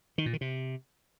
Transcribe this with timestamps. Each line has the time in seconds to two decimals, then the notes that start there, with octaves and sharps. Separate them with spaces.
0.18 D#3
0.26 A#2
0.33 D#3
0.41 C3